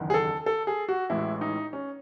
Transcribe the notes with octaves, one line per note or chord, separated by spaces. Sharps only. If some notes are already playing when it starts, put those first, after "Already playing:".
Already playing: F#1 E2 D#3
G#4
A4
A4
G#4
F#4
A1 A2 E3 G#3 E4
D#4
C#4